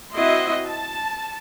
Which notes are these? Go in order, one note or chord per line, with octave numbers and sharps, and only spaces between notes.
C4 E4 F#4 D#5 E5 C6
A5